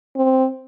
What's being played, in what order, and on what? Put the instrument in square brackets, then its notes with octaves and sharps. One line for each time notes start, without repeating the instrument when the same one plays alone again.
[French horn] C4